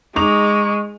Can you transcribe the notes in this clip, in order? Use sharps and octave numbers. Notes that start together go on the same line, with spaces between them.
G#3 D#4 C#6 D6 F7